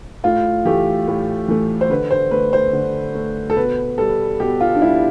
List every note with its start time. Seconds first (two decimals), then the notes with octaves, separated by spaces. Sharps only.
0.24 A2 F4
0.65 E3 A3 G4
1.08 A2
1.48 E3 A3
1.81 C5
1.90 D3 B4
2.11 C5
2.31 A3 B4
2.53 C5
2.73 D3
3.15 A3
3.50 A4
3.57 B2 B4
3.98 G3 A4
4.40 B2 G4
4.61 F4
4.75 D4
4.81 G3 E4